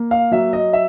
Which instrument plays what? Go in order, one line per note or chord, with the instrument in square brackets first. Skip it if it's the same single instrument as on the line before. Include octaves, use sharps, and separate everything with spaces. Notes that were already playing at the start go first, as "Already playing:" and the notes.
Already playing: [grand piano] A#3
F5
F#3 E5
D#5
E5